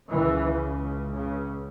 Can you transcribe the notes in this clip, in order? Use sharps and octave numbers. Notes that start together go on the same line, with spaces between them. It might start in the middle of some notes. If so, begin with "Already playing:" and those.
C#2 C#3 E3
C#3